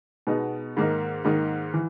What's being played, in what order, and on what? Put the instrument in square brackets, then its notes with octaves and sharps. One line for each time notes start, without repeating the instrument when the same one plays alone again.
[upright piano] B2 G#3 B3 D#4
G#2 D#3 A#3 D#4
G#2 D#3 A#3 D#4
E3